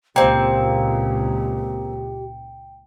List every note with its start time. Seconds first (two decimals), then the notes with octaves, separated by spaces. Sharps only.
0.16 C#2 A#2 A#3 C4 G4 G5